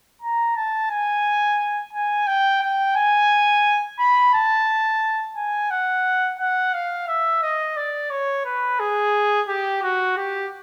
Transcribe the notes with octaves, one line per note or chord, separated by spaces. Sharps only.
A#5
A5
G#5
G#5
G5
G5
G#5
B5
A5
G#5
F#5
F#5
F5
E5
D#5
D5
C#5
B4
G#4
G4
F#4
G4